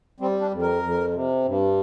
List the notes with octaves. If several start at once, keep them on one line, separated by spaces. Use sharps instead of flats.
G3 C4
D4
F2
A#4
F2
C3
G2